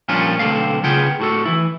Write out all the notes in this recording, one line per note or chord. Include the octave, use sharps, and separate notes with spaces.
A#2 F3 G3 C#4 D4 F4
B1 D3 F3 A3 C4 F5
C#3 B3 F4 G#4 G5
A2 F#4 A4
E3 E4